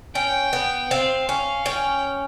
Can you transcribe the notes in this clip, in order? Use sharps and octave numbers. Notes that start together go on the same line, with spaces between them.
C#4 G5
B3
C4 F5
C#4
C#4 G5